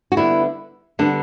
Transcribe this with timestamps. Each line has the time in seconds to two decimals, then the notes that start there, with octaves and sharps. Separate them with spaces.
0.12 F#4
0.17 D3 G3 B3 E4
0.99 D3 G3 B3 D4